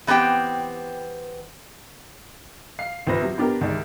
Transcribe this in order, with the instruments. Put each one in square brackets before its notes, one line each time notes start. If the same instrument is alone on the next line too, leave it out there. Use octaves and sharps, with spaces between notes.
[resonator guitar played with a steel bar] E3 B3 C4 G4 G5
[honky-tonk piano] F5 C7
C2 A#2 B4 C5 A#6
C3 F#3
B3 D4 G4 A#4
C2 G#2 D#3 D5